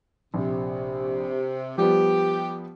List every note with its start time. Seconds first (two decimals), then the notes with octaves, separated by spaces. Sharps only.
0.34 A#1 C3
1.78 F3 G3 B3 G4